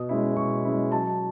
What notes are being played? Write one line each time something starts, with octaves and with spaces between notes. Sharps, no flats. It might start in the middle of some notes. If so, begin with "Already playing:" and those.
Already playing: B2 D#6
G#3 C#4 E4
B2 C#6
G#3 C#4 E4
F#3 A5